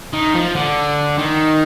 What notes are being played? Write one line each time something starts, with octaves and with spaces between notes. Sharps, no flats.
D#3
F3
D3
D#3